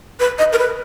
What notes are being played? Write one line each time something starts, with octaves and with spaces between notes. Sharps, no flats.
B4
D#5
A#4
B4